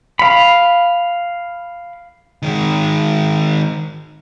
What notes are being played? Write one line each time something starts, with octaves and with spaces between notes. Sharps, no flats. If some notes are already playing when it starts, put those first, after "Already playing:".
F5 B5
D#3 G#3